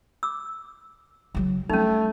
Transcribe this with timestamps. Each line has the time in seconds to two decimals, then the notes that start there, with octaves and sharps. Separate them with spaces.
0.23 D6 E6
1.35 C#3 F#3
1.70 G3 A3 C#4 D#4